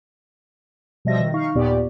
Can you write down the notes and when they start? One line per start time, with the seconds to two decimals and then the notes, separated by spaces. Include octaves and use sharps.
1.05 B2 F3 G3 D#5 E5 A#6
1.20 D#3
1.34 D#4 F5 C#6
1.55 D#2 A#2 B3 G4 D5